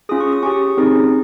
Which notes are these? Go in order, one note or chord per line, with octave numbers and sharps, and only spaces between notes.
C#4 F4 G#4 D#6
C#6
D#6
C#4 G4 C#6
C4 D#4 G#4